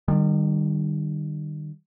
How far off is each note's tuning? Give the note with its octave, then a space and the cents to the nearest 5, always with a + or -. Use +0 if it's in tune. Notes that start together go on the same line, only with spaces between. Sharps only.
D#3 -35 G3 +0